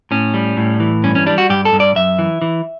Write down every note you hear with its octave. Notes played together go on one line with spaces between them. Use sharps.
A2 C#4
G3
A2
E3
G2 C#4
C#4
G3 D4
F#4
G2 G4
A4
G2
D5
F#2 E5
E3
E3